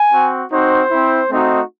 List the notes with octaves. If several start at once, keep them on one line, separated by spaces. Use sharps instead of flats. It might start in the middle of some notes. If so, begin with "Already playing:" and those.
Already playing: G#5
C4 F#4
C4 D#4 F#4 C5
C4 E4
A3 C4 D#4 F#4